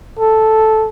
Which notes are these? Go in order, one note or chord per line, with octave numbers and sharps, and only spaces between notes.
A4